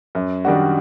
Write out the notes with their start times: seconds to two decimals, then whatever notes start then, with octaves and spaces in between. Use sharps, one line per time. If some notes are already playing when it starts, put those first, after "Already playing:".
0.15 F#2
0.45 D#3 G3 D4 F#4